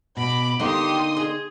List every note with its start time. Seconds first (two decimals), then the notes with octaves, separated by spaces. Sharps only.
0.17 B2 B5 D6
0.60 D3 A#3 D#4 G4 C6 D#6
1.17 G#4